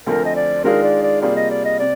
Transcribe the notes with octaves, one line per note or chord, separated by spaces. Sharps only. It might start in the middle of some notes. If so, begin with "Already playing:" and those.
D2 D3 F3 C4 A#4
D#5
D5
D#3 G#3 D4 F4 G#4 A#4
D5
D5
C3 G3 A#3 F4 G#4 D5
D#5
D5
D#5
C3 D5